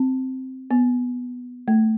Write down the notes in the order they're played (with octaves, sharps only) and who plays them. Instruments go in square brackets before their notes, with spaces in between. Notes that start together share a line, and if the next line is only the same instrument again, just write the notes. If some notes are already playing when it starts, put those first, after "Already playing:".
Already playing: [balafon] C4
B3
A3